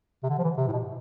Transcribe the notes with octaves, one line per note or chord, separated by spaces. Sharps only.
C3
D3
F3
E3
C3
A2
B2